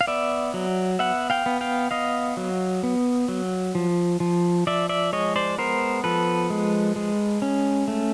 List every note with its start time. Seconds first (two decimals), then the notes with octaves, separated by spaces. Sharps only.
0.01 F5
0.07 B3 D5 E5
0.54 F#3
0.99 B3 E5 F#5
1.30 F5 G5
1.46 B3
1.61 F5 G5
1.91 B3 D#5 F5
2.37 F#3
2.83 B3
3.28 F#3
3.75 F3
4.20 F3
4.67 F3 D5 E5
4.89 D5 E5
5.13 G#3 C#5 D#5
5.36 C5 D5
5.58 B3 A#4 C5
6.04 F3 A4 B4
6.50 G#3
6.96 G#3
7.42 C#4
7.88 A3